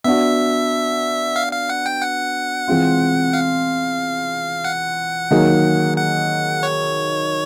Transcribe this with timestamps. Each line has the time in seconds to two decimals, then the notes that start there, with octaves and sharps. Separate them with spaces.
0.04 B3 D4 F#4 E5
1.36 F5
1.53 F5
1.69 F#5
1.86 G5
2.02 F#5
2.68 E3 G#3 C4 F4
3.33 F5
4.64 F#5
5.31 D#3 F#3 A#3 D#4 G#4
5.97 F#5
6.63 C#5